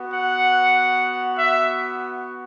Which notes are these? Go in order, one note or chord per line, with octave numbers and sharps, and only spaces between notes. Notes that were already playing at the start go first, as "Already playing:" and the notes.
Already playing: B3 F#4
F#5
E5